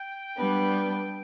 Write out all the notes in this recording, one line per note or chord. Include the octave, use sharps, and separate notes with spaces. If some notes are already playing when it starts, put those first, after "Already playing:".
Already playing: G5
G3 B3 D4